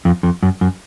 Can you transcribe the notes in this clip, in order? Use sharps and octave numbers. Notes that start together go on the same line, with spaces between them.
F2
F2
F#2
F#2